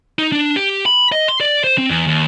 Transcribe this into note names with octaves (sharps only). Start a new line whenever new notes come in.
D#4
D4
G4
B5
D#5
C6
D5
C5
C4
E2
D#2